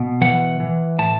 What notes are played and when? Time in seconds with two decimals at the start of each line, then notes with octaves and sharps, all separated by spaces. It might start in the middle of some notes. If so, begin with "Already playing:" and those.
Already playing: B2
0.21 E3 F#5
0.60 E3
0.99 A2 A5